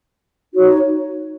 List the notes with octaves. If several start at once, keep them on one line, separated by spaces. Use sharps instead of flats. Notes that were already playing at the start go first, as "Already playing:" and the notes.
D#4 F#4 C#5